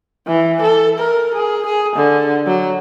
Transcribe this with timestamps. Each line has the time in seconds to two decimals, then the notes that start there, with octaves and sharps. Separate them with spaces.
0.27 E3
0.62 A4
0.99 A#4
1.35 G#4
1.66 G#4
1.96 D3
2.47 F#3